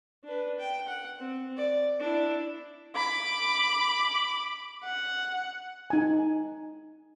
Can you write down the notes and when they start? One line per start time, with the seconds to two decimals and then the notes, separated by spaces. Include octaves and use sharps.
0.24 D4 B4
0.59 G5
0.88 F#5
1.18 C4
1.57 D5
2.00 D4 E4
2.96 B5 D6
4.85 F#5
5.90 D#4 G#5